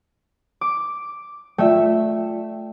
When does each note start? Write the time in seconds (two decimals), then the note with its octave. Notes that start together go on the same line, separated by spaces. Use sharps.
0.61 D6
1.58 A3 F4 D5 E5 G5